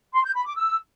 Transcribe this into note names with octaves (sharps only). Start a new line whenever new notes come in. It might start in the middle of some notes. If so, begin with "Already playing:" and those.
C6
G6
B5
D6
E6